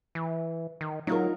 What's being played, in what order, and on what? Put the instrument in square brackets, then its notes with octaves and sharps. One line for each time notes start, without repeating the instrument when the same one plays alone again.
[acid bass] E3
D#3
[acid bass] F#3 [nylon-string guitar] D#4 F4 A#4